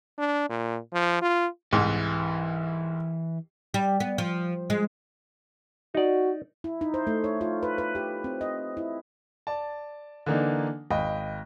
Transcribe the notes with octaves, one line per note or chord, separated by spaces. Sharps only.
D4
A#2
F3
F4
C2 G#2 E3
G3
B3
F3
G#3
D#4 F#4 D5
E4
D#4
C5
A3
C#5
F4
B4
B4
G4
C4
D#5
E4
D5 A5
D3 E3 A#3 D4 D#4
G#1 D#5 F5 G5 B5